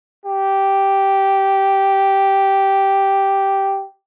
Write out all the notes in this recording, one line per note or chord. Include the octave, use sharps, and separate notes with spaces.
G4